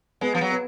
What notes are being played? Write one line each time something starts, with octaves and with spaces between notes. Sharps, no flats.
G#3 B3
F3
F#3
B3